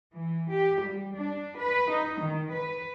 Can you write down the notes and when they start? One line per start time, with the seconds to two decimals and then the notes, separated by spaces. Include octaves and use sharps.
0.13 E3
0.50 G4
0.81 G3
1.16 D4
1.57 B4
1.91 D#4
2.22 D#3
2.52 B4